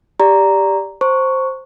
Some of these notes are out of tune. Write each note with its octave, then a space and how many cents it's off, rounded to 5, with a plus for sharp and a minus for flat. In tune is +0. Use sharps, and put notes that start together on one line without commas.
G4 +10 D5 -10 A#5 +0
C5 +5 A#5 -30 C#6 +0